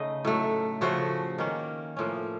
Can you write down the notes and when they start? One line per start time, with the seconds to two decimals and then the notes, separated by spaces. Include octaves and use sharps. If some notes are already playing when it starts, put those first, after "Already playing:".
Already playing: C#3 A3 D#4 D#5
0.25 A2 F#3 A3
0.81 C#3 F3 A3 F#4
1.38 D#3 A#3 C#4
1.97 A2 F3 A#3 C#4